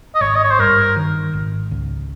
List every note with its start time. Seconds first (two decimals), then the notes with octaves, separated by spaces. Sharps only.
0.15 D#5
0.21 G#1 C#5
0.35 D#5
0.43 C#5
0.51 C5
0.59 G2 A#4
0.97 D#3
1.34 G#1
1.71 C#2